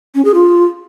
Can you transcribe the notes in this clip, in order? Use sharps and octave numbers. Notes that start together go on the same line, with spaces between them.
C#4
G#4
F4